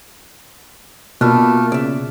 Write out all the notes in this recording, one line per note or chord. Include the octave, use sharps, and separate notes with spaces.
B2 A3 A#3 D4 F4 F6 F#6
C#3 D5 E5